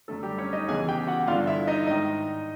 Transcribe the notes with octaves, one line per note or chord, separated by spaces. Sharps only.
F#2 D3 A3 A4
G3 G4
C#4 C#5
D#4 D#5
E2 C#3 E3 G#4 G#5
G4 G5
F#4 F#5
G2 D3 F4 F5
E4 E5
D#4 D#5
G#2 D#3 D#4 D#5